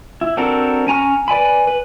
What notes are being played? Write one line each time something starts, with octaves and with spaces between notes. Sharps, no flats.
E4
C4 D4 F#4 A4 A#4
C#4 G#5 A#5 C#6 F6
B4 D5 G#5 B5
B4